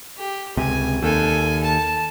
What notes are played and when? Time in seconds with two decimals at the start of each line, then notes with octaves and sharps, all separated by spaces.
0.17 G4
0.57 C#2 C3 G#5
1.02 D#2 A4 G#5
1.63 A5